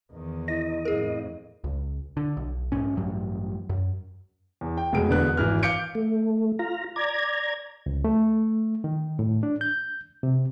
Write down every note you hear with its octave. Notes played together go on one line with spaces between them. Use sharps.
E2 D#3
E4 D#5
F2 A2 G#4 A#4
C#2
D3
B1
D#1 G#2 C#4
A1 G2 F#3
F#2
E2
G5
F1 B2 G#3 G#4 D7
E1 D3 B3 F#6
G#1 E3 F6
F5 D6 G6 C#7 D7
A3
F4 A#5
D5 A#5 G#6
C#2
A3
D#3
A2
D4
G6
C3